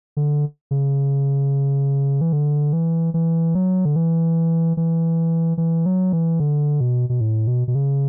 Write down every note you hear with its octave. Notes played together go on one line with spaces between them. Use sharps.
D3
C#3
E3
D3
E3
E3
F#3
D3
E3
E3
E3
F#3
E3
D3
B2
B2
A2
B2
B2
C#3